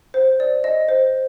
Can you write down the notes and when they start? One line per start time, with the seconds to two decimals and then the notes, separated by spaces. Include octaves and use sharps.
0.14 C5
0.40 D5
0.64 D#5
0.89 C5